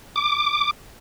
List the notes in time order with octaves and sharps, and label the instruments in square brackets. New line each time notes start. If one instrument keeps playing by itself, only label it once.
[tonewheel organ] D6